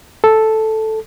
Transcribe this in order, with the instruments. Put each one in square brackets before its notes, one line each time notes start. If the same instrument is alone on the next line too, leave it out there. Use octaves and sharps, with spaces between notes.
[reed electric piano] A4